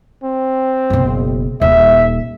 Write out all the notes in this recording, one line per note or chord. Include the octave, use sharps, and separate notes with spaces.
C4
F#1 B2
D#1 E5